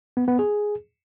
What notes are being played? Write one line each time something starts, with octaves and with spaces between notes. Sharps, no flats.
B3
B3
G#4